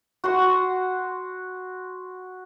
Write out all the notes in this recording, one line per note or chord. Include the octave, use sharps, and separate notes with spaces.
F#4 F#5 C6